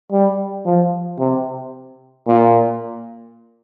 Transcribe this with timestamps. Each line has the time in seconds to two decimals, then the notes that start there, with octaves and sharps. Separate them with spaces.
0.12 G3
0.66 F3
1.19 C3
2.27 A#2